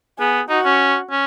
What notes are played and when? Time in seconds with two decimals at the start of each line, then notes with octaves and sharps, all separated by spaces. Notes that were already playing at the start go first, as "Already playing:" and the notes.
0.19 B3 G#4
0.49 D#4 F#4
0.65 C#4
1.11 C#4